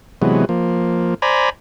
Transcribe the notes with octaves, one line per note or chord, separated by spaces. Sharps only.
C3 E3 F#3 G#3 B3
F3 A#3
C5 D5 G#5 A#5 B5